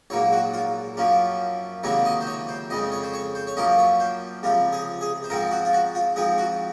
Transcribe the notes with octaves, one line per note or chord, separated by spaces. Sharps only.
A#1 G#2 F#3 A#3 C#5
F#4
F4
F#2 F3 A#3 C#4
C#2 C3 D#3 F#3 A#3 C#5
D#5
C5
C#5
C5
F2 C#3 G#3 D#5
C#5
C5
C#5
C5
C#5
F#2 F3 A#3 C#4 D#5
C#5
C5
C#2 C3 F3 F4
G#4
G#4
C5
G#2 F3 G#3 C4 A#4
F#4
F4
F#4
F4
G#2 F3 C4 G#4
F#4